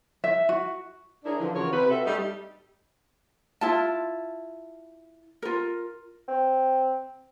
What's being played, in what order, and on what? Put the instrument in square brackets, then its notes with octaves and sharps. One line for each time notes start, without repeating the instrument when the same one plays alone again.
[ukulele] E5
F#4
[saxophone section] D4 E4 G#4 A#4 C#5 D5
D3 E3 F3
C#3 E3 F4 F#4 A#4 C#5
C3 B4
C4 F#4 A4 E5
G3 A3 D#4
[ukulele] E4 F4 A5
F4 A#4
[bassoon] C4